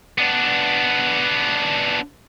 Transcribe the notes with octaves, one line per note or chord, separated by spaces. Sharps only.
B3 D4